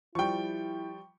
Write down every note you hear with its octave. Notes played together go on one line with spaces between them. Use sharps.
F3 G3 E4 G5 C#6